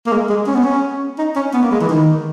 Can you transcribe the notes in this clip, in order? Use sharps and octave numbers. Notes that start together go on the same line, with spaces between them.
A#3
G#3
G#3
C#4
B3
C#4
D#4
C#4
B3
A#3
G#3
E3
D#3